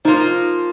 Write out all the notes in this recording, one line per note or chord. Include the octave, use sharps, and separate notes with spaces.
F3 A#3 D#4 F4